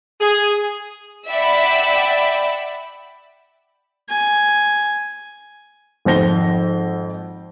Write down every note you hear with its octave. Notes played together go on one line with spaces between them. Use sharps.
G#4
D5 E5 F#5 G5 B5
G#5
G#1 F2 C5 A#6 G7